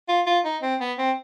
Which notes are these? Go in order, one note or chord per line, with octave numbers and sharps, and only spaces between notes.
F4
F4
D#4
C4
B3
C4